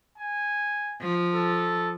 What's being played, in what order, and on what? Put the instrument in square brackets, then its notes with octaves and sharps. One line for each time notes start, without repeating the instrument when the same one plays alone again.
[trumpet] G#5
[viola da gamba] F3
[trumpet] A4